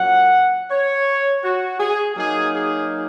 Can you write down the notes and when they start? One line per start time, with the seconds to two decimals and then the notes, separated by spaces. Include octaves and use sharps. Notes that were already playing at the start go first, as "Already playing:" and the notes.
Already playing: A#2 F#3 C#4 F#5
0.71 C#5
1.44 F#4
1.80 G#4
2.16 F#3 A#3 D#4 G#4
2.52 G#4